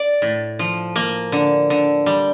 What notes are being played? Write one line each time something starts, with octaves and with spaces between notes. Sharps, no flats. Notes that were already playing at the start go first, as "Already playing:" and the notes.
Already playing: D5
A2
F3
A#3
D3
D3
G3